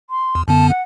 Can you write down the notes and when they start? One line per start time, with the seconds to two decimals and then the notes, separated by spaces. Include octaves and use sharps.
0.10 C6
0.35 E2
0.48 F#2 D3 B3 A5
0.70 F#5